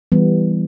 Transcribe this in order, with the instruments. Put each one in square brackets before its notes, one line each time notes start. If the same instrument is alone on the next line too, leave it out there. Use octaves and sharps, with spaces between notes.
[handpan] E3 G3 B3